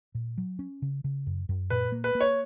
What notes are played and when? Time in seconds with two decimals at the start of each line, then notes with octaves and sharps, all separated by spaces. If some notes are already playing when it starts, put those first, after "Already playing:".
0.15 A#2
0.38 F#3
0.59 C#4
0.82 C#3
1.04 C#3
1.27 F#2
1.49 F#2
1.70 A#2 B4
1.92 A#3
2.04 B4
2.15 A#3
2.20 C#5